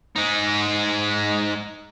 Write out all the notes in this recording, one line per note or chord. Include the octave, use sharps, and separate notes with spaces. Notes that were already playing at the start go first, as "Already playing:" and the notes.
G#3 D#4